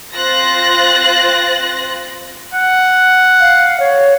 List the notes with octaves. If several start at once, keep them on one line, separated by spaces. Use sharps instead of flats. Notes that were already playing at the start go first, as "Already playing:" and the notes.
C4 F4 C5 F#6 A6 A#6
F#5
F5
C#5